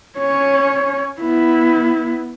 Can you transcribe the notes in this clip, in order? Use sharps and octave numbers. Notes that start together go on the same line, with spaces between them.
C#4 C#5
B3 E4